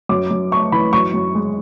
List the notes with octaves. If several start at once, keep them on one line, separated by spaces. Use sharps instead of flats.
F#2 D6
F#2
A3 C#6
E3 B5
F#2 C#6
F#2
G#3